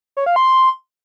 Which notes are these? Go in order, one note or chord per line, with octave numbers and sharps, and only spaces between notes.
C#5
F5
C6